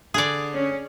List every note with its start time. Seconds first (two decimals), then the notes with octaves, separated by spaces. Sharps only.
0.14 D3 G#4 D5 D#6
0.54 C#4